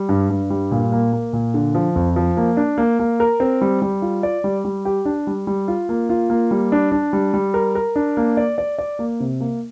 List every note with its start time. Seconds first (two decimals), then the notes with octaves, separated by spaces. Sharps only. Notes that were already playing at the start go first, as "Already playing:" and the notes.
Already playing: G3
0.09 G2
0.30 G2
0.50 G3
0.71 A#2
0.92 A#3
1.13 A#3
1.33 A#2
1.54 D3
1.75 F3
1.96 F2
2.16 F3
2.37 A#3
2.57 D4
2.78 A#3
2.99 A#3
3.20 A#4
3.40 C4
3.61 G3
3.82 G3
4.02 F4
4.23 D5
4.44 G3
4.65 G3
4.85 G4
5.05 D4
5.27 G3
5.47 G3
5.68 F4
5.89 A#3
6.09 F4
6.30 A#3
6.51 G3
6.72 D4
6.92 D4
7.13 G3
7.34 G3
7.54 A#4
7.75 A#4
7.96 D4
8.17 A#3
8.37 D5
8.58 D5
8.79 D5
8.99 A#3
9.20 C3
9.40 A#3